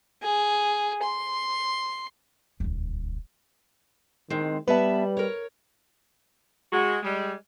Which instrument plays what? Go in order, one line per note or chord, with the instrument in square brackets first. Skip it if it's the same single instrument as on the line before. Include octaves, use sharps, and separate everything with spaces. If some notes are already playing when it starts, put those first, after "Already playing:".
[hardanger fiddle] G#4
C6
[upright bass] D#1 C#2
[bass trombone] D#3 [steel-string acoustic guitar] G#3 C4
[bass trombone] G3 [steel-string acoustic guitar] B3 E5 A5 [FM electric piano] B4
[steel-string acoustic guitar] A#4 C#5
[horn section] G#3 F#4
G3 G#3